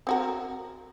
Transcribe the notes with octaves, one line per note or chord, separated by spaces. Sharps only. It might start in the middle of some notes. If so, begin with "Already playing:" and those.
C4 F#4 A#4